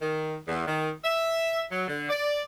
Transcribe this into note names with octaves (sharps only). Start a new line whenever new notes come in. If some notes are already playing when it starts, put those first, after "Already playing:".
D#3
E2
D#3
E5
F#3
D3
D5